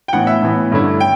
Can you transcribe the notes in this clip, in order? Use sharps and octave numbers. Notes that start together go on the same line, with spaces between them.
G5
A2 E3 B3 F#5
E5
A2 E3 B3
G2 D3 A3 C#4 E4
G5